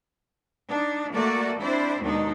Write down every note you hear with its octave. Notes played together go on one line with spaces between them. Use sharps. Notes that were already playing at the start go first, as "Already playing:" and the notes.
D4 D#4
A3 A#3 F#4 A4 A#4 D5
C4 D4 E4 C5 D5
D#2 B2 D#3 G#3 D4 D#4